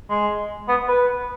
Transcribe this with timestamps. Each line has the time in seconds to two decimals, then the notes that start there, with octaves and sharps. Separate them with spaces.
0.10 G#3
0.68 B3
0.88 B4